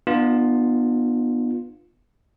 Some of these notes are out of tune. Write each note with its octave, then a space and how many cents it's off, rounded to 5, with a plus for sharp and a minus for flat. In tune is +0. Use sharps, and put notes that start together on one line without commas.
B3 -15 D4 +45 F4 +0